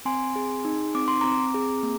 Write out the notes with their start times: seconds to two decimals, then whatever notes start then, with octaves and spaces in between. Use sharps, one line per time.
0.05 C4 G#5 C6
0.36 G#4
0.65 D#4
0.95 C4 D6
1.08 C6
1.21 C4 A#5 D6
1.54 G#4
1.83 A#3